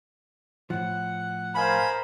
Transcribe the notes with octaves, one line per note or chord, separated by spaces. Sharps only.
A2 F3 F#5
A#4 C5 D#5 F5 G#5 B5